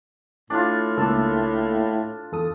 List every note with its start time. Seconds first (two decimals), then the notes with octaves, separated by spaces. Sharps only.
0.50 A2 D4 F4
0.97 C#2 A#3 D4 A4
2.32 E2 A4 D#6